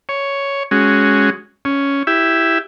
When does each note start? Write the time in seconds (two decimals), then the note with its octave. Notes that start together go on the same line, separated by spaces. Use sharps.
0.09 C#5
0.71 G#3 C#4 F#4
1.65 C#4
2.07 E4 G4 E5